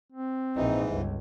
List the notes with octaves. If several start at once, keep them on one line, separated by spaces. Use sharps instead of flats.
C4
A#1 G#2 E3 D#4
G1 C#2